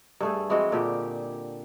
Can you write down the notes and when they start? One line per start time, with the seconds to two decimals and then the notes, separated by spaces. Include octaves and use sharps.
0.21 G2 A3 G#4
0.50 E3 G#3 C4 F#4
0.72 A#2 D3 G4